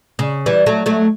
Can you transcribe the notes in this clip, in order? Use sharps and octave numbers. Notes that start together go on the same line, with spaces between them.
C#3
E3 G3
F#3 A3
F#3 A3